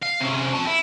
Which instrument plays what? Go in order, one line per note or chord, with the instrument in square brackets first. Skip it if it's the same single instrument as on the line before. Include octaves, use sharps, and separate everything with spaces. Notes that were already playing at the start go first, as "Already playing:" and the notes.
[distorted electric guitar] F5
C3 C#4
C4 A5
E4